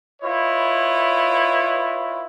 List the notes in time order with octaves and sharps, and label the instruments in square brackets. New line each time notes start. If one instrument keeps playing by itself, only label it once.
[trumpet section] E4 F4 B4 C#5 D#5